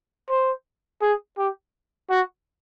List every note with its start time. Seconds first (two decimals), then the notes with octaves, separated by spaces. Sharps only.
0.29 C5
1.02 G#4
1.38 G4
2.10 F#4